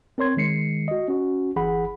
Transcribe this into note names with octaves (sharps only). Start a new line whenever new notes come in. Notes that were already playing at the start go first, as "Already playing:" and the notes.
C4 A#4 C#5 C6 G#6
D#3 G#3 C7 C#7
F#4 D#5
C#4 F#4
G1 E3 G#4 F#5 B5